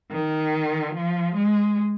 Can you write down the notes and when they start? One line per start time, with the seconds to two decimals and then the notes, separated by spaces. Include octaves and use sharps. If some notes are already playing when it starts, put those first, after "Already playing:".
0.11 D#3
0.94 F3
1.35 G#3